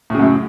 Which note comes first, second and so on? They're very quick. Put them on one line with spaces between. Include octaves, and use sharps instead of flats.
A2 C#3 F#2